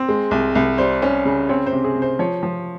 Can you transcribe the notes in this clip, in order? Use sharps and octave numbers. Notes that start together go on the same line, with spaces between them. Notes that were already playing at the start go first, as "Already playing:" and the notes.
Already playing: C4
G#3
C2
C2
G3 C5
C#4
C#3
C4 C#5
C5
C3
G#4
C3
C5
F3 C#5
F3